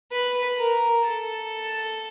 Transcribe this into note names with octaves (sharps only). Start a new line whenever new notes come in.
B4
A#4
A4